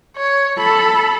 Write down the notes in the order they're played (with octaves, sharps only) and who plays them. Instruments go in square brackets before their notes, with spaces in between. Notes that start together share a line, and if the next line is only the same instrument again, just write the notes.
[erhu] C#5
[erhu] A4 [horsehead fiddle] B5